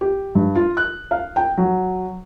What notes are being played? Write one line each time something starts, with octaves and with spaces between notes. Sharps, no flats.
G4
G2
F4
F#6
F5
G5
F#3